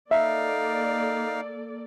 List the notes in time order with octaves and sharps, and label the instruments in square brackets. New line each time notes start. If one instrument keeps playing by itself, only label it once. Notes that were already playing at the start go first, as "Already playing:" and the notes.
[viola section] A#3 A4 D5 [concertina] D#4 F5 [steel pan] E5